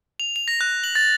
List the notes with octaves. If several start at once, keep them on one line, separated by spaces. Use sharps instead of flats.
F7
F7
A#6
F#6
F#7
A6